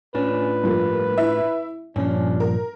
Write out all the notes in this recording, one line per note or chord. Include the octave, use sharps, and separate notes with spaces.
A2 C#4 D4 F4 B4
G2 F3 A#3
E4 E5
G2 A#2 F3 C#4 D4
A#4